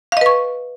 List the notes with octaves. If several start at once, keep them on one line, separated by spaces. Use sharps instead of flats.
B4 D#5 F5 C#6